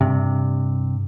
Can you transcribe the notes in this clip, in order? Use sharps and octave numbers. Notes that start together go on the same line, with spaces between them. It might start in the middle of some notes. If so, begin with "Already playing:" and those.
G2 C3